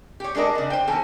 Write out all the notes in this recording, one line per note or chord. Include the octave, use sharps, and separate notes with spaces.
G4 C#5
G#3 D4 A4 A#4 D#5
C#3 D4
C5 G5
B2 D#3 A4 G#5